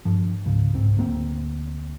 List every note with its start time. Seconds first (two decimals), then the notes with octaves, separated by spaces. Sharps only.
0.05 G2 F3
0.45 C#2 G#2 C#3
0.74 C2 G#2 C4
0.97 D2 F#3 A#3 C4